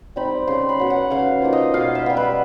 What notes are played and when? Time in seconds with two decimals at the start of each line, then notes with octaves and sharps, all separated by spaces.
0.16 G3 C4 D#4 B5
0.47 C#3 C6
0.69 B5
0.79 F#3 B3
0.90 F#5
1.10 C#3 F5
1.42 F3 A#3 D#4
1.53 D#5
1.74 B2 F5
1.95 E5
2.06 G3 B3
2.17 B4